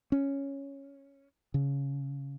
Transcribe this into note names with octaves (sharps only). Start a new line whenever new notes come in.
C#4
C#3